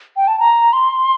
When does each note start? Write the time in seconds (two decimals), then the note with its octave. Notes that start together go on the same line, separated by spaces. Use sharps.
0.17 G5
0.28 A5
0.40 A#5
0.73 C6